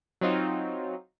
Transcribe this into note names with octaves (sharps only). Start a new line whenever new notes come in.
F#3 C4 D#4 F4